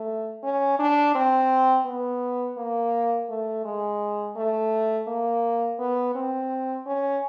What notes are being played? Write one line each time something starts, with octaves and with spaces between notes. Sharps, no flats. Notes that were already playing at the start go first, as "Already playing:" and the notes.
Already playing: A3
C#4
D4
C4
B3
A#3
A3
G#3
A3
A#3
B3
C4
C#4